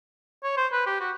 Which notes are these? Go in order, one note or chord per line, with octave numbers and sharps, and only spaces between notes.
C#5
C5
B4
G4
F#4